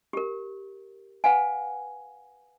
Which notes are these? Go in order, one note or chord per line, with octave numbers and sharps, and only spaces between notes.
G4 A#4
B4 F5 F#5 G#5